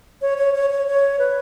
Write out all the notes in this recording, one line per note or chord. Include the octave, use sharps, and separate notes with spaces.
C#5
C#5
C#5
C#5
C#5
B4